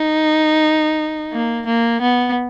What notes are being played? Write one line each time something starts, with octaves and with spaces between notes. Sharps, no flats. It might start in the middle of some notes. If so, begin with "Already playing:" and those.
Already playing: D#4
A#3
A#3
B3